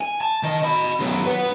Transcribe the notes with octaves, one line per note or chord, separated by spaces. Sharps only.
G#5
A5
D#3 D#5
D#5 B5
F#2 B2
B4 F#5